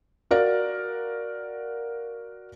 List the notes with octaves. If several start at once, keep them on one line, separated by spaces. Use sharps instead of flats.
F#4 A#4 D5 F5